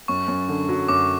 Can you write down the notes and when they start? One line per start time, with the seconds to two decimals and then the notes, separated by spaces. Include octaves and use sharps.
0.08 F#2 C#6
0.28 F#2
0.49 D3
0.69 F#3
0.88 F#2 D6